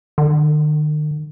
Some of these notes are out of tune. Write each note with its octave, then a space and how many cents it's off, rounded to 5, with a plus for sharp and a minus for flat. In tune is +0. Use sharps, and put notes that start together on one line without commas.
D#3 -45